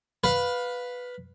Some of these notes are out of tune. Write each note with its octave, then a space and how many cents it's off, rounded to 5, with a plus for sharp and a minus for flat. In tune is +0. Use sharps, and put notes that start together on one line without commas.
B4 +0 F5 +20